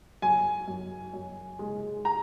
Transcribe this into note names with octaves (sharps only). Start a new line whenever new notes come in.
F#2 G#5
F#2
F#2
G#3
A#5